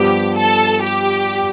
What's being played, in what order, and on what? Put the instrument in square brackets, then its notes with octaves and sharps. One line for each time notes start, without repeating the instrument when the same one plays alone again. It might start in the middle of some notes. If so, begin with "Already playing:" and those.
Already playing: [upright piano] G2 F3 B3 [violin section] G4
[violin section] A4
G4